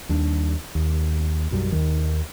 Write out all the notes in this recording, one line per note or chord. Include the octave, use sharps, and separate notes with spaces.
D#2 G3 D4
D#2
B1 F#2 G3
D#2 D#3